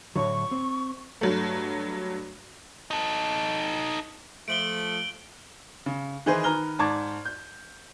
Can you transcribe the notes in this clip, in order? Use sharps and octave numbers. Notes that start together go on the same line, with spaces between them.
A2 D3 F#3 C#6
C4
G2 F#3 A3
D#4 A4
F3 A3 D7 F#7 G7
C#3
D#3 E3 D#4 G#4 B4 C5
D#3 B4 A#5 F6 G7
G#2 D5 A5 C#6 D6 G#6
G6